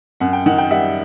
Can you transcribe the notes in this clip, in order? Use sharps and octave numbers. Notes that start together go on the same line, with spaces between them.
F#2 F#5
G5
D#3 F#5
G5
G3 E5 F#5